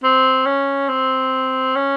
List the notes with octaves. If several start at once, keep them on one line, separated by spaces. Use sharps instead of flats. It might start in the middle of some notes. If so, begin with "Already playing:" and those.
C4
C#4
C4
C#4